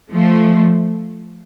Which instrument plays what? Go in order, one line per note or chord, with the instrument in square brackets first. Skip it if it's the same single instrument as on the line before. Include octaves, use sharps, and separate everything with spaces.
[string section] F3 A3